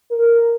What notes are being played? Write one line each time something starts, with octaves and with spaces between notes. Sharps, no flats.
A#4